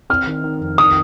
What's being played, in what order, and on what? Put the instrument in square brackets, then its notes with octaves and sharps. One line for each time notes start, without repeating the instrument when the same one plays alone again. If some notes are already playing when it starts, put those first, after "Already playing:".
[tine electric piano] C4 [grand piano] F6
[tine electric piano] D#3
D#3
F2
[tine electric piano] D#3 [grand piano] D#6